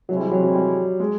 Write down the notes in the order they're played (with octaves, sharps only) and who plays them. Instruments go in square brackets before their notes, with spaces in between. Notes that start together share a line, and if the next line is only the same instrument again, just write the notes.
[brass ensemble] C3 E3 G#3 C4 E4 [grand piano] F#3
[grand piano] G3
F#3
F#3
G3
G#3